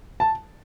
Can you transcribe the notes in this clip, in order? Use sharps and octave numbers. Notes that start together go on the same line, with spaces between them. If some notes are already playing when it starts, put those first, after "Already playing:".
A5